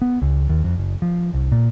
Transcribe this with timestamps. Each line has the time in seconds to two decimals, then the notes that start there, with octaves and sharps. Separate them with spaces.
0.02 B3
0.22 C#2
0.49 D#2
0.64 F2
0.78 F#1
1.02 F3
1.34 C2
1.52 A#2